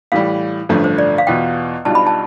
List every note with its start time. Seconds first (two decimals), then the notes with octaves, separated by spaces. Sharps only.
0.12 A2 E3 G3 F5
0.69 A1 G2 D3 F3 A3
0.84 C5
0.98 D5
1.18 F5
1.27 E2 B2 B3 F4 G5
1.85 B1 B2 G3 D4 F4 A5
1.95 B5
2.07 A5